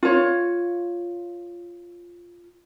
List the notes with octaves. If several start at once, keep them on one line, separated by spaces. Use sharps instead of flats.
F4 C#5